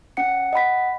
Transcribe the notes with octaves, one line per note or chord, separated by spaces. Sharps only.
C#4 F#5 C#7
D#5 F#5 B5 B6